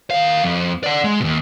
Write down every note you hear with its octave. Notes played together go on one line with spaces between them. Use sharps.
D#3 F5
F2
D5 F#5
G#3
D#2 B2